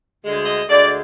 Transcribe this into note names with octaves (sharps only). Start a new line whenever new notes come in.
D2 D3 G#3
D#5
D2 D3 G#3 D5